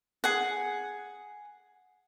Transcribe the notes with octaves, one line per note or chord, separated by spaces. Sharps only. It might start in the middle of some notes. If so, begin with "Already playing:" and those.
G#4 F#5